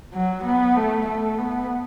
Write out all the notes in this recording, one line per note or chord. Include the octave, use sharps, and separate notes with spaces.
F#3
B3
A3
A3
B3